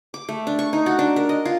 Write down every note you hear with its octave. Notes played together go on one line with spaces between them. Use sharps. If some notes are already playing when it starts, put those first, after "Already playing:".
D6
A3
D4
C#6
D#4
F#4
D4
A#4
D#5
F4